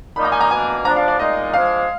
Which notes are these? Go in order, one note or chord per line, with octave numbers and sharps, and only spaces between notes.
A#2 F3 A#3 D#4 B5
A#5
G#5
A#5
B2 A#3 D4 G#5
F3 B3 D4 A#5
F5
D5
A#2 G#3 D#4 D#5
F3 G#3 D4 F5